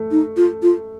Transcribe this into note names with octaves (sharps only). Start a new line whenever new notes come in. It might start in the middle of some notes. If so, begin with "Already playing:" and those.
Already playing: A3
D#4
F4
F4